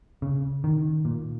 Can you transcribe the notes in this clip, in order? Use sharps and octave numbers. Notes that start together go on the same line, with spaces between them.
C#3
D#3
A#2